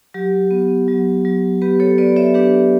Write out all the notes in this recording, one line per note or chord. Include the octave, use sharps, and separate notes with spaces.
F#3 G4
B3
F#3
F#3
B3 G4 B4
A4 C#5
B3 B4 D5
C#5 E5
D4 G4 B4